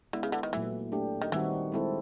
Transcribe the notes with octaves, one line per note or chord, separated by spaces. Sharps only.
D3 G#3 B3 E4
C#3
D3
D#3
A#2 E3 F#3 A3
A3 D4 G4
D#3
D#3 E3 G3 C4 D#4 F#4
G#3 C4 E4 A4